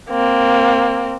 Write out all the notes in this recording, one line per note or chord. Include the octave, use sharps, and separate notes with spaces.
A#3 C4